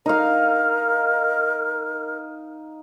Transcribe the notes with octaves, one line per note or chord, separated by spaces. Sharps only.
D#4 A#4 F5